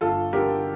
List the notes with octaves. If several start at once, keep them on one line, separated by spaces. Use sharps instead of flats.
G1 F4 A4
D3 G4 A#4